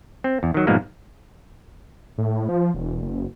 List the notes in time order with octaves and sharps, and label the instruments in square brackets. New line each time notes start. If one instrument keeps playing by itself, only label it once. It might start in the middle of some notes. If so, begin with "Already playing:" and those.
[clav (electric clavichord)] C4
E2
D#3 F#3
G#2 B2 F3 G3 G#3 A#3
[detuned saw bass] A2
F3
E1
F#1